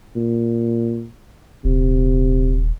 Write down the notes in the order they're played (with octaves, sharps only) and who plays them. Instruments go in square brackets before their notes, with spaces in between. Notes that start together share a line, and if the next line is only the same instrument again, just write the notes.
[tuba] A#2
[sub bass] D#1 [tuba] C3